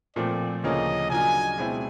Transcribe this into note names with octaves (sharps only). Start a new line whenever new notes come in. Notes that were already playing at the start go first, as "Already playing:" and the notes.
A#2 F3 A3 C4 D5
D2 C#3 F3 A#3 C#4 D#5
C#3 F#3 A#3 D4 F4 G#5
B2 G#3 C4 E4